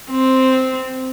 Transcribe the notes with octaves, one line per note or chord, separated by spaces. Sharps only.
C4